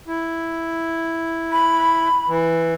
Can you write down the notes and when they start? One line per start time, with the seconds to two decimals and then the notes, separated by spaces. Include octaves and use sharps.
0.07 E4
1.51 B5
2.28 E3